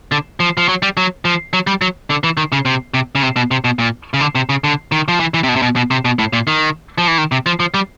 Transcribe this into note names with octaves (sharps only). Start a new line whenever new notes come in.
D3
F3
F3
F#3
G3
F#3
F3
F#3
G3
F#3
D3
E3
D#3
C#3
C3
C3
C#3
C3
B2
C3
B2
A#2
C#3
D3
C3
C#3
D3
D#3
F3
E3
E3
C3
B2
C3
B2
B2
C3
B2
A2
A#2
D#3
F3
E3
D#3
C3
F3
F3
G3